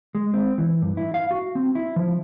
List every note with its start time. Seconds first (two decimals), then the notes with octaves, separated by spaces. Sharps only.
0.15 G#3
0.34 C4
0.58 E3
0.82 G2
0.97 E4
1.14 F5
1.31 F#4
1.55 C4
1.75 E4
1.96 F3